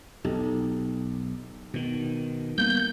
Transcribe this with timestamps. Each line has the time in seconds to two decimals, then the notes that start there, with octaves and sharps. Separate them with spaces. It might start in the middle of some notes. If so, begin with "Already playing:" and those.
0.24 B1 D#4 G4 A4
1.74 B2 D#3
2.58 G3 A#3 B3 G6